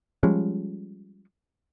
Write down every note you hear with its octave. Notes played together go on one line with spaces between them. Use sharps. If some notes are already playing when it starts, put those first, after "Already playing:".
F3 G3 G#3 C#4